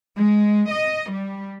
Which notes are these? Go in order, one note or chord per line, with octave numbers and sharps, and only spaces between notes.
G#3
D#5
G3